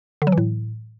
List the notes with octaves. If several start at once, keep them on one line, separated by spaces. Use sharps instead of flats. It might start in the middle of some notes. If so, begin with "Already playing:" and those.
D3
F#3
E3
A2